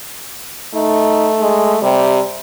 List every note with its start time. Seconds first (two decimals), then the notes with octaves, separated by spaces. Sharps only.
0.74 A3 D#4
1.41 G#3
1.82 C3 G3